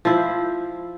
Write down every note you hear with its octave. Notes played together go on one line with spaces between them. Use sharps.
F3 E4 C5